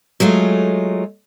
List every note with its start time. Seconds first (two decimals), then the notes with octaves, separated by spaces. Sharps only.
0.20 F#3 G#3 A3 F4